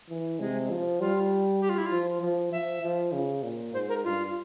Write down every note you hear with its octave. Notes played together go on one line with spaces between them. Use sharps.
E3
C3 G#3
F3
G3 F4
G4
F4
E4
F4
F3
F3
F3 E5
F3
C#3
A#2
G#2 C5
A#4
G2 F4